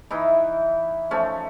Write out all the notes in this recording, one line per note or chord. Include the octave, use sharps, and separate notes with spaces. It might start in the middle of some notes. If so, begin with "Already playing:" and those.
E3 D#4 E4
F3 A3 C#4